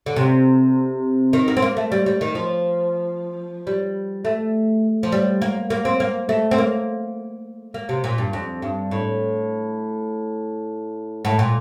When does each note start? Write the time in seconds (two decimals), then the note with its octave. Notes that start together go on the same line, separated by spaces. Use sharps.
0.06 D3
0.16 C3
1.33 D#3
1.48 A#3
1.57 C4
1.62 A#3
1.77 A3
1.92 G3
2.06 G3
2.21 D#3
2.35 F3
3.67 G3
4.25 A3
5.03 F3
5.12 G3
5.42 A#3
5.70 A#3
5.85 C4
6.00 A#3
6.29 A3
6.51 C4
6.58 A#3
7.74 A#3
7.89 C3
8.04 A#2
8.18 G2
8.33 F2
8.62 G2
8.91 A2
11.25 A2
11.39 A#2